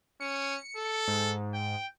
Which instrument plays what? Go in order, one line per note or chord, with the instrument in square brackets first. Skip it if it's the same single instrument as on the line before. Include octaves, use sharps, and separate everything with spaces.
[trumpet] C#4 [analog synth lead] C#7
[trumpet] A4
[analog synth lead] G#2
[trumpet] G5